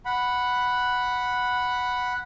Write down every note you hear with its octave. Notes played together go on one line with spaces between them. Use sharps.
F#5 B5